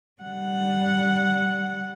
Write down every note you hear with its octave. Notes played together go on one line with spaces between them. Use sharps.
G3 F#5